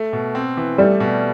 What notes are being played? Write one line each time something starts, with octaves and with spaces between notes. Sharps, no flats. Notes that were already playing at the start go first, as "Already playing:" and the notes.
Already playing: A3
B2
C4
E3
G3 A3
B2